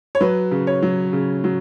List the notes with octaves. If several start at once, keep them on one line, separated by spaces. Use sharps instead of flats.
C#5
F#3 B4
C#3
C#5
F#3
C#3
F#3